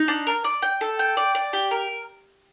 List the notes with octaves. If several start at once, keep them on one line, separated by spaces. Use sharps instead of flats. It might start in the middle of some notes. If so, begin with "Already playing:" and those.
Already playing: D#4
D4
A#4
D5
G5
A4
G5
D5
D5
G4
A#4